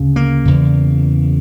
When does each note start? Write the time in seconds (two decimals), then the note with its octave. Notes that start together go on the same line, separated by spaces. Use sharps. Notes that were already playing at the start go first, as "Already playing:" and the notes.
Already playing: D2 C#3
0.16 A#3
0.45 E2 C#3